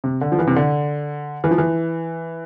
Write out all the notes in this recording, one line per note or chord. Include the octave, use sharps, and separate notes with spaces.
C3
D3
F3
E3
C3
D3
E3
F3
E3